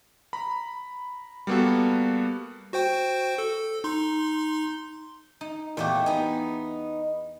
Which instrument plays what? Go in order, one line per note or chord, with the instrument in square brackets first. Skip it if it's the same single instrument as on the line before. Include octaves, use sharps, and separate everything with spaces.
[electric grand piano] A#5 B5
G3 A#3 B3 F#4 A4
[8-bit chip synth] F#4 C5 G5
A4
D#4 C6
[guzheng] D#4
[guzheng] E2 G4 [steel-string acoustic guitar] A#2 D#3 A3
[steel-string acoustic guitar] B3 D#4 [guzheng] G#4